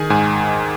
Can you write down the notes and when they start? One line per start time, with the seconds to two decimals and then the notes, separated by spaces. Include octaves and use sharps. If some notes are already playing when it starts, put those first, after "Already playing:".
Already playing: D#3 G#4 G#5
0.10 G#2 G#5